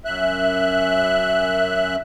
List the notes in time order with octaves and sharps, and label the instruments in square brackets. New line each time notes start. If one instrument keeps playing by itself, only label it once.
[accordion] F#2 E5 F#6